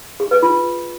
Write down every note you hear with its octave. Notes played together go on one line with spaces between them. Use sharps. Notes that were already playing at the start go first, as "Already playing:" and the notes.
G#4
B4
F4